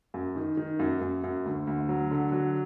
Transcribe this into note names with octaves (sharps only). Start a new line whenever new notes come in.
F#2
D#3
D#3
F#2
F#2
F#2
D2
D2
F#3
D3
F#3